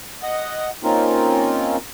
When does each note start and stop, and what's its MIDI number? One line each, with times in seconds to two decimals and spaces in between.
0.23 0.70 75
0.23 0.70 78
0.83 1.76 58
0.83 1.76 60
0.83 1.76 61
0.83 1.76 63
0.83 1.76 65
0.83 1.76 70